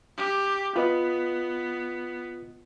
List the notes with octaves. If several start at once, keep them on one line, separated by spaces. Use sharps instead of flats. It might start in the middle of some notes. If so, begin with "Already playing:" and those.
G4
B3 F4 B4 D#5